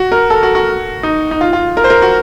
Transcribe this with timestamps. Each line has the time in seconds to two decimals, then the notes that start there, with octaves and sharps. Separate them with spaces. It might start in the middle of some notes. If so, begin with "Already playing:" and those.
Already playing: F#4
0.12 A#4
0.30 A4
0.43 F#4
0.55 F#4
1.03 D#4
1.31 D#4
1.41 F4
1.53 F4
1.77 A#4
1.84 C5
1.90 A#4
2.02 F#4